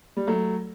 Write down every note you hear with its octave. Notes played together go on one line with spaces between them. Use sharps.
G3
F#3 A3